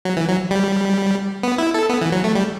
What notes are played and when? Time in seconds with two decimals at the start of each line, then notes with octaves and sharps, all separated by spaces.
0.05 F#3
0.17 E3
0.28 F#3
0.51 G3
1.43 B3
1.58 E4
1.74 A4
1.89 B3
2.01 E3
2.12 F#3
2.24 A3
2.35 G3